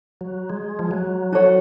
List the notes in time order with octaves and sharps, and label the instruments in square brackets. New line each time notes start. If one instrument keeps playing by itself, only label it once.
[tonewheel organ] F#3
G#3
F3
F#3
[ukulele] F#4 A4 C#5 F#5